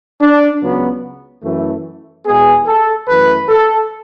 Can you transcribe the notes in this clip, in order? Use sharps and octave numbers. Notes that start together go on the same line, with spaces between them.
D4
C#2 C#3 F#3 B3
F#2 E3 A3
E2 B2 G#3 B3 G#4
A4
F#2 E3 A3 B4
A4